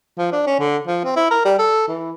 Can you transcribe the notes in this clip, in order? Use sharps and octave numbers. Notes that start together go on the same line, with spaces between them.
F3
D4
C#4
D3
F3
C4
E4
A#4
G3
A4
E3